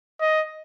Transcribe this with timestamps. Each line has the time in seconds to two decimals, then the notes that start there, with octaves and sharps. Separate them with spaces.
0.21 D#5